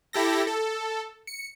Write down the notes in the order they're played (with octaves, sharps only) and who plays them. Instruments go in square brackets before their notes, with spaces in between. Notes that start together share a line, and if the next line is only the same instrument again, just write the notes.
[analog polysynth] E4 G4 A4 A#6
A4
C#7